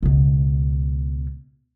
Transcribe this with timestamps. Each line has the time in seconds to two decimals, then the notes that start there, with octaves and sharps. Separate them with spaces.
0.03 C#2 B2